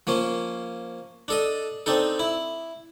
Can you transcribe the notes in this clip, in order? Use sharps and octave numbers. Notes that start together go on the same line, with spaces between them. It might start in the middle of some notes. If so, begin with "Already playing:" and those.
F3 A#3 C#4
D4 A4 D#5
C4 D4 D#4 A4
E4